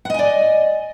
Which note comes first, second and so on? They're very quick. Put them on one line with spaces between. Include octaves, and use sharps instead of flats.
F#5 D#5 G#5 D5